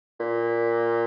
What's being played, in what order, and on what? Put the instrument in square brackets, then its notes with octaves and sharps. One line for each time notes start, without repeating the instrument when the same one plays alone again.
[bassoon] A#2